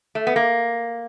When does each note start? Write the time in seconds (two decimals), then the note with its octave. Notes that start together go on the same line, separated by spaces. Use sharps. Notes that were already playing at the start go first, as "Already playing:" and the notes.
0.15 A3
0.27 B3
0.36 A#3